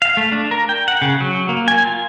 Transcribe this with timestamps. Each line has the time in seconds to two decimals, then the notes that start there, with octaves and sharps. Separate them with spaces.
0.02 F5
0.17 A3
0.32 D4
0.51 A#4
0.69 G5
0.88 F#5
1.02 C#3
1.20 F#3
1.49 A#3
1.68 G#5
1.83 F4